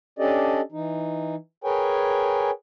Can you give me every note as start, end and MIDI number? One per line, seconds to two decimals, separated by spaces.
0.19 0.61 61
0.19 0.61 62
0.19 0.61 67
0.19 0.61 69
0.19 0.61 74
0.19 0.61 75
0.72 1.35 52
0.72 1.35 63
1.64 2.51 68
1.64 2.51 70
1.64 2.51 71
1.64 2.51 73
1.64 2.51 79
1.64 2.51 80